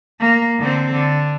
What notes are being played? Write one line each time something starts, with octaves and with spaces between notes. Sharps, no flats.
A#3
D3 C4
D3